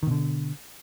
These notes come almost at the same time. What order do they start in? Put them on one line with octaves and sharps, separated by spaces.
D#3 B2 D3